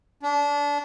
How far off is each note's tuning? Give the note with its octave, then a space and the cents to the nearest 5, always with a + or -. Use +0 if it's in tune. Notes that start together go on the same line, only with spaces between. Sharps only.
D4 -25